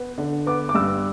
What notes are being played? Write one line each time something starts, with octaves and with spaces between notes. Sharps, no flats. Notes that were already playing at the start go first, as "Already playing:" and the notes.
Already playing: B3
D3
B3 D6
D6
G2 E6